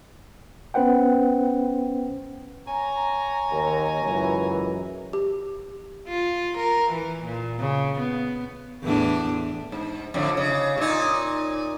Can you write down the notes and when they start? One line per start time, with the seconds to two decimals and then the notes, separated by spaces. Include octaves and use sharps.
0.74 B3 C#4 B4 C5 F#5 G5
2.68 C#5 G#5 A#5
3.51 D#2
4.03 C#2 F#2 E3
5.13 G4
6.08 F4
6.58 A#4
6.92 E3
7.26 A#2
7.60 C#3
8.00 B3
8.83 E2 A2 D4
9.72 G#2
10.14 F2 A2 D3
10.37 C#3
10.78 A#2 D#4